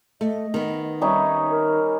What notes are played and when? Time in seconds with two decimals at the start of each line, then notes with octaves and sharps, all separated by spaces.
0.21 A3 D#5
0.54 D#3 B3
1.01 G3 C#4 D#4 E5
1.50 A#4